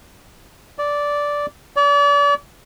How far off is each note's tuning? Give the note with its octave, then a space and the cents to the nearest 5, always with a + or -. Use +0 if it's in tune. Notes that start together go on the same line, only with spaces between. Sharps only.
D5 -10
D5 -40